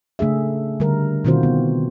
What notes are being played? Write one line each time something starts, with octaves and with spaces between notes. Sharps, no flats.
C#3 A3 D4 G#4 E5
D3 G3 A#4
B2 D#3 C4 F4 F#4 C5
B3